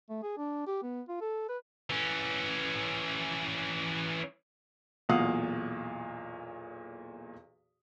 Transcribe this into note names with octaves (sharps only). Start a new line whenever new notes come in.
A3
G#4
D4
G4
B3
F4
A4
B4
E3 C#4
B1 E2 A#2 F5 F#5 D#6